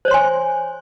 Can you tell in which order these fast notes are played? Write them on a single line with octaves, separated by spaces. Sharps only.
C5 C#5 C6 G#5